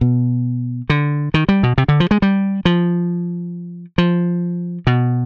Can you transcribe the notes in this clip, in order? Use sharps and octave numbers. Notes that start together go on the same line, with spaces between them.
B2
D3
D#3
G3
B2
C3
D3
F3
G#3
G3
F3
F3
B2